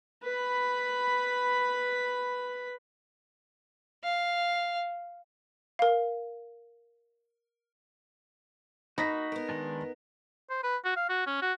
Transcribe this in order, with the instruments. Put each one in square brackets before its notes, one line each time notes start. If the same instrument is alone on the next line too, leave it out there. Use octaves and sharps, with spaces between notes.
[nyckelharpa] B4 B5
[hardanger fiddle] F5
[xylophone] A#4 F5
[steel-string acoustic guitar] A#3 [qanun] D#4 [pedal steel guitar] F#4 [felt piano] B5 A#6 B6
[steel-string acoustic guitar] B3 A#4
[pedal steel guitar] D#3 G#3 D4
[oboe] C5
B4
F#4
F5
F#4
C#4
F#4